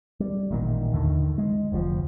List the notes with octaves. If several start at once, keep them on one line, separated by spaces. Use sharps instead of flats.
G3
A1 A#2 D3 D#3
D#2 A2 D3 D#3
G#3
F1 D2 A#2 F3